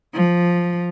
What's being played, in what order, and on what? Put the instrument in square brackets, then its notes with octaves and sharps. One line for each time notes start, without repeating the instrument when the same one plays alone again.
[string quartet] F3